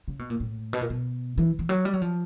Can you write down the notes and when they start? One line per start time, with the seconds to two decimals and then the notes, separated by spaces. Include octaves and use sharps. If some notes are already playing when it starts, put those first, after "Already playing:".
0.08 C#3
0.19 B2
0.30 A#2
0.40 A2
0.73 B2
0.81 A#2
0.90 B2
1.38 E3
1.59 E3
1.69 F#3
1.85 G3
1.94 F#3
2.02 F3